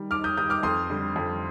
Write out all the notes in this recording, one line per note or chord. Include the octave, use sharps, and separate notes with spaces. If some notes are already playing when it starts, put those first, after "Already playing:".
Already playing: D#3 G3
D#2 D6 F6
D#6 G6
D#3 G3 D#6 G6
D6 F6
F2 C6 D#6
D3 G3
F2